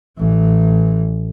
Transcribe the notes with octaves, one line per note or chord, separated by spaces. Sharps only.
A1 E3